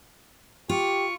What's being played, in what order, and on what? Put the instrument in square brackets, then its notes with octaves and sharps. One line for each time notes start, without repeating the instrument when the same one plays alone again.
[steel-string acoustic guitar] F4 [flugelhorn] G4 [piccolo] C#6